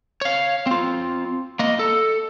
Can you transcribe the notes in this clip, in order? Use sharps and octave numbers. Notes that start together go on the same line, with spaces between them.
C#5 F5
C4 F4
A#3 D#5
A4